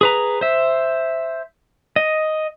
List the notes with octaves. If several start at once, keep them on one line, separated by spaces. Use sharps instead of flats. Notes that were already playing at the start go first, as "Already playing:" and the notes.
G#4 B4 A#5
C5 E5
D#5